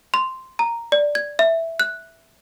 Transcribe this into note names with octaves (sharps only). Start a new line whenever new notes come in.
C6
A#5
D5
G#6
E5
F#6